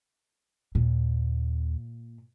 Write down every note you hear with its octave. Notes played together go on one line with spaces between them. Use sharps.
D#2 A#2